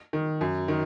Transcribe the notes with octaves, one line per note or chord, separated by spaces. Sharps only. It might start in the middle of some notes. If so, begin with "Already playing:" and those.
D#3
F#2
D#3